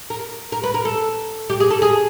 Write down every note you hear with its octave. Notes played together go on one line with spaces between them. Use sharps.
A#4
A#4
B4
A#4
A4
G4
G#4
A4
G#4